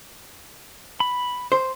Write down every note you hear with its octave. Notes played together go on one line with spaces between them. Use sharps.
B5
C5